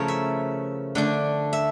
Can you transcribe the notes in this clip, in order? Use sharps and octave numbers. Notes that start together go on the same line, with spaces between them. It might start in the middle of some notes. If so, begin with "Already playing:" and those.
Already playing: C#3 F3 A3 E4 A#4 C#5
E5
D3 A3 D4
E5